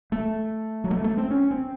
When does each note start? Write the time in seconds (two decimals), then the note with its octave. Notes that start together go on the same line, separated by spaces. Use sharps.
0.12 A3
0.84 F#3
0.91 A3
1.04 A3
1.17 C4
1.31 C#4
1.51 C4